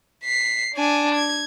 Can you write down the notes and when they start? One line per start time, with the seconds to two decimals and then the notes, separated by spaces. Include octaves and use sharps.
0.24 B6 C7
0.75 D4 G#5
1.15 G#6